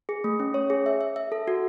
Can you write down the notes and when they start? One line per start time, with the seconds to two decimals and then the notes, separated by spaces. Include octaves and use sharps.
0.09 G#4
0.24 A3
0.40 C#4
0.54 C#5
0.70 G#4
0.86 E5
1.01 E5
1.16 E5
1.32 A4
1.48 F#4